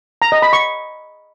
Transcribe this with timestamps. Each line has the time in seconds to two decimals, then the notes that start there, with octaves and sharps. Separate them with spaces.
0.22 A#5
0.32 D#5
0.42 B5
0.53 C#6